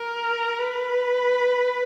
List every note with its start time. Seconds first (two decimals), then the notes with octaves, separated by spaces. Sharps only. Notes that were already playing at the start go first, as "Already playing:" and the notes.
Already playing: A#4
0.58 B4